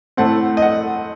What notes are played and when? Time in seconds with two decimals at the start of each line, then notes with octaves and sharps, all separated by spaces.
0.17 A2 A3 C4 F#5
0.57 D#5
0.62 F#5